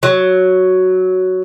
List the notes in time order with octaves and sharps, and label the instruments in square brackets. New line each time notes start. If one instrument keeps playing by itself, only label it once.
[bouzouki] F#3